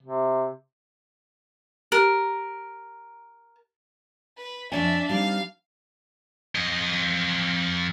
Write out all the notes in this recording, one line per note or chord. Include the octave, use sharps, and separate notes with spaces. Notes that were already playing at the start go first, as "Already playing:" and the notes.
C3
G4 A#4
B4
F2 D4 C#5 E5 G#5
G3 C4 D#4 F5
F2 D#5